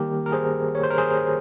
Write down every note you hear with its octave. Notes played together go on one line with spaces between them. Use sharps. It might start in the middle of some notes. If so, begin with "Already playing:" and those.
Already playing: D#3 G3 A#3 G4 A#4
A#4
G#4 C5
C#5
C5
A#4
G#4 C5